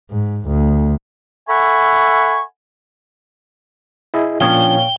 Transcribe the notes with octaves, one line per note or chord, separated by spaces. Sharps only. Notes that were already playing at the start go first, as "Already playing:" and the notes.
G#2
D2
A4 E5 F#5 G#5 B5 C#6
E4 G#4 D#5
A#2 F3 C#4 D4 C#5 F5 G5